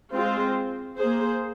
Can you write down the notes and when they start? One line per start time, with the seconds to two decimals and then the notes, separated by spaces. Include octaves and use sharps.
0.13 G#3 C4 F4 C5
0.97 A#3 G#4 C5